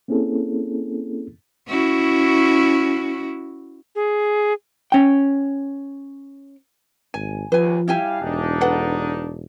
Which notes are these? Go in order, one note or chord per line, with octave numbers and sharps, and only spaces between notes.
A#3 C4 C#4 E4 G#4 A4
C#4 E4 F#4
G#4
C#4 G5
G#1 G#5
D#2 F3 B4 G#5
G3 E4 G4 F5 G#5
E1 D4 D#4
A4 B4 F#5